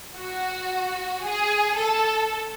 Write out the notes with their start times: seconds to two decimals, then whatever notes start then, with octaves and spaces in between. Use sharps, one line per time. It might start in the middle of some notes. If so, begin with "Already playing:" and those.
0.15 F#4
1.24 G#4
1.78 A4